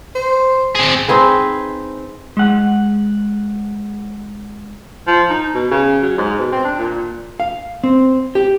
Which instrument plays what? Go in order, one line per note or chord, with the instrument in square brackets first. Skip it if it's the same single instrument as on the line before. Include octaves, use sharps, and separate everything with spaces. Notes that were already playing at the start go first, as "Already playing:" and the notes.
[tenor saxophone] C5
[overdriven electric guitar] C4 G#4
[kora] C4 D#4 G#4 B4
[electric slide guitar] G#3 F#5
[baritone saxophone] F3
D#4
B2
C#3
F#3
G#2
B2
C4
D4
A#2
[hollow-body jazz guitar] F5
C4
G4